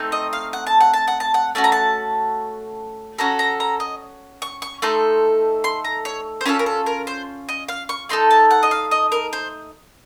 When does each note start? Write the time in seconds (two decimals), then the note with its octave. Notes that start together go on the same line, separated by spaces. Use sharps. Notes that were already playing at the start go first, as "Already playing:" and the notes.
Already playing: A3 C4 D#4
0.12 D#5
0.33 F5
0.53 F#5
0.67 A5
0.80 F#5
0.93 A5
1.08 F#5
1.20 A5
1.34 F#5
1.55 A3 C#4 F#4 A5
1.64 A#5
1.72 A5
3.18 C#4 F#4 A4 A#5
3.39 A#5
3.60 A#5
3.80 D#5
4.42 C#6
4.62 C#6
4.82 A3 D#4 A4 C6
5.64 C6
5.84 A#5
6.05 C#5
6.41 C5
6.45 C#4 F4 A4 A#4
6.59 A#4
6.66 A4
6.86 A#4
7.07 C5
7.49 D#5
7.69 F5
7.89 C#6
8.09 A3 D#4 A4 C6
8.30 A5
8.51 F#5
8.63 D#5
8.71 F5
8.91 D#5
9.12 A#4
9.33 C5